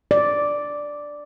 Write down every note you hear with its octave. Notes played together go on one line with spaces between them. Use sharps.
D5